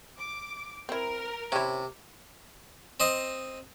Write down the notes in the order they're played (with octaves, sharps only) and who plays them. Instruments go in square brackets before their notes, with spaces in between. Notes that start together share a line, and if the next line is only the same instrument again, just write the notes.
[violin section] D6
[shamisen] C4 E4 [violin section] A#4
[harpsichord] C3 [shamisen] C#4 E4
[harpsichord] C4 D#5 C6